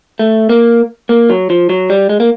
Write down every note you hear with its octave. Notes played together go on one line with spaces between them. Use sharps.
A3
A#3
A#3
F#3
F3
F#3
G3
G#3
A#3